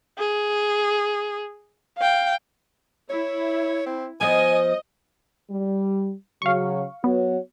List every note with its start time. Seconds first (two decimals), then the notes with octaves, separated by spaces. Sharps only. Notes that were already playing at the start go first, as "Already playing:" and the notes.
0.18 G#4
1.98 F5 G5
3.10 E4 C#5
3.86 C4
4.21 F3 B3 D#5 G#5
5.50 G3
6.42 C#3 F#3 F5 C#6
7.04 F#3 B3 F#4 C#5